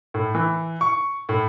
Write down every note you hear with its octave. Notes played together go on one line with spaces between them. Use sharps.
A2
E3
C#6
A2